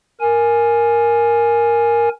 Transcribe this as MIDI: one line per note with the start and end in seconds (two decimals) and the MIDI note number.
0.21 2.09 70
0.21 2.09 80